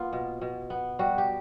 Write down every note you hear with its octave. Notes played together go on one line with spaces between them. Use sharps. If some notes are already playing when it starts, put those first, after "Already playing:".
Already playing: A#3 B3 F4
B2
B2
B3
G3 F#4
G4